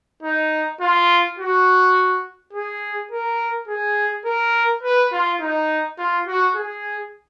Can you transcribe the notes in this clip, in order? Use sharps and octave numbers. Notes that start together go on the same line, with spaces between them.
D#4
F4
F#4
G#4
A#4
G#4
A#4
B4
F4
D#4
F4
F#4
G#4